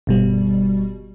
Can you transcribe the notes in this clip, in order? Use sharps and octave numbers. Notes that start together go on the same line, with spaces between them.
G1 B2 G3